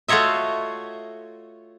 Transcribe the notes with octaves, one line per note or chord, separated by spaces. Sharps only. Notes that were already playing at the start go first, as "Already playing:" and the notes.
A3 F4 F#4 C#5 D#5 E5